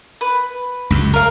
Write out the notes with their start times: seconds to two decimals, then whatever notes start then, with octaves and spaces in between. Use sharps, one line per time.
0.21 B4
0.90 C#2 F#2
1.14 A#4 F5